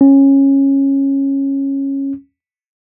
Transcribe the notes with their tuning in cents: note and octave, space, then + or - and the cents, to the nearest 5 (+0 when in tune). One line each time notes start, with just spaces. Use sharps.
C#4 -15